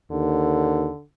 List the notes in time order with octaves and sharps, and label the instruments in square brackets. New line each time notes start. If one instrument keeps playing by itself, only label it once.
[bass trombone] D#2 [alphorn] D3